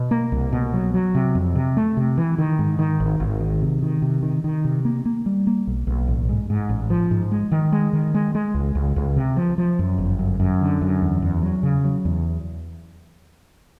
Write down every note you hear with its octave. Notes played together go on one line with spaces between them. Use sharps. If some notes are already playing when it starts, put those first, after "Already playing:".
Already playing: B2
A#3
C2
B2
F#3
F#3
C3
F2
C3
A3
C3
E3
D#3
G#2
D#3
G#1
G#1
D#3
C3
D#3
C3
D#3
D#3
C3
A#3
A#3
G3
A#3
B1
B1
A1
G#2
G#2
A1
F3
G#2
G#3
D#3
G#3
D#3
G#3
G#3
C#2
C#2
C#2
C3
F3
F3
F#2
G1
F#2
F#2
D3
F#2
E2
E2
F#3
C#3
F#3
E2